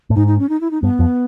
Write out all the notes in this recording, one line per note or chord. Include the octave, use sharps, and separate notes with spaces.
A2
G#2 D#4
D#4
C#4
D#4
E4
D#4
G2 B3
F2